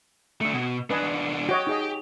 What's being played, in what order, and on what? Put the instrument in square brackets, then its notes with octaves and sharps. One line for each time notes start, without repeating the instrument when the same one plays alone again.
[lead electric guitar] A3 D4
B2
[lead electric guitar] E2 D4 [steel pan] B4 D#5 G#5
[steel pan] F#4 C#5 D#5 [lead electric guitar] G4
[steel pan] D#4 G#4 D#5